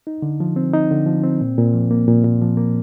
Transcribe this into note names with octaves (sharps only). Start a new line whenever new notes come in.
D#4
D3
F3
C4
D#4
D3
F3
C4
A#2
A#2
F3
A#3
A#2
A#2
F3
A#3